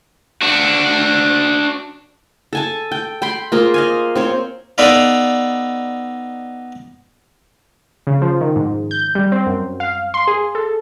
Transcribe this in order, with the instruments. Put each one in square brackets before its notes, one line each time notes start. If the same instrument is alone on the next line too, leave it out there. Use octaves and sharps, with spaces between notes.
[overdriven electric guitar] D4 F#4
[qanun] A4 G#5 A5
G5
G5 B5 C6
A#3 F4 G#4 C5
D#5 F5 G#5
C4 C5 C#5
[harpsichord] B3 D#4 A4 B4 D5 F5
[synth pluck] C#3
F3
D#3
G#2
G6
G3
C4
F#2
F5
C6
G#4
A4